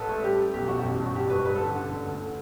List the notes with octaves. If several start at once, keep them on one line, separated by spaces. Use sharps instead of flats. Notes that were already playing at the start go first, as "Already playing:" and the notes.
Already playing: A1 A4 B4
A3
G3 G4
G3
B1 G4
B1 F#4
A1 G4
G2
F#4
G3 G4
G2 B4
G3 B4
A4
D3
G4
D3
D3
D2
D3